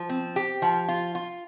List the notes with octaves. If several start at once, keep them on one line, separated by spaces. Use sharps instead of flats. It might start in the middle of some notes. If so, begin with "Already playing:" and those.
Already playing: F3
C4
G4
F3
F4
F4